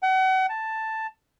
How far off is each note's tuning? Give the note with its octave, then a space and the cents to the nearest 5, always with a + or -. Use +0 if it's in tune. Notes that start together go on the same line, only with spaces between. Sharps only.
F#5 +35
A5 +5